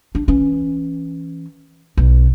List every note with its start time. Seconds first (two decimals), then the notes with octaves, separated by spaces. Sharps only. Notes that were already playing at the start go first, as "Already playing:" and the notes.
0.15 D4
0.28 E3 C#4
1.97 B1